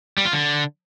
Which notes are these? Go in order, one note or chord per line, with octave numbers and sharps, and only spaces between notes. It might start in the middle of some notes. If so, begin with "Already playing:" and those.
G3
F4
D3